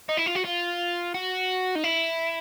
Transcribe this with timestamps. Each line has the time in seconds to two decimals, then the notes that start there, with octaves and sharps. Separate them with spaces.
0.09 D#4
0.17 E4
0.26 F4
0.35 F#4
0.44 F4
1.14 F#4
1.75 D#4
1.84 E4